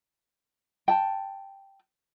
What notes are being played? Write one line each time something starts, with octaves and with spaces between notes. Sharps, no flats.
G5 A5